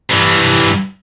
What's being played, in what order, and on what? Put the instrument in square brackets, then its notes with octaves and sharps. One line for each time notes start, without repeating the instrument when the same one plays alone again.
[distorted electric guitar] G2 E3